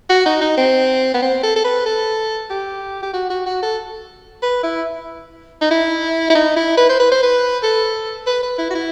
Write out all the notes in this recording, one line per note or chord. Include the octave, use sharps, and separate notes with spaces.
F#4
D#4
D#4
C4
B3
C4
A4
A4
B4
A4
G4
G4
F#4
F#4
F#4
A4
B4
E4
D#4
E4
E4
D#4
E4
B4
C5
B4
C5
B4
A4
B4
B4
E4
F#4
E4